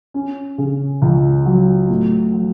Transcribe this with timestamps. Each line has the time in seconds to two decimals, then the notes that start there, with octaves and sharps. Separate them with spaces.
0.14 C#4
0.58 C#3
1.02 C#2
1.46 F#3
1.89 A2
2.33 F#3